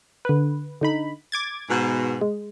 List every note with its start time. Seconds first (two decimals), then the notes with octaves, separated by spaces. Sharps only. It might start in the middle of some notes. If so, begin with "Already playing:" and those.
0.25 D3 B4
0.81 D3 D#4 B5
1.32 D6 G#6 A6
1.70 G#2 B2
2.21 G#3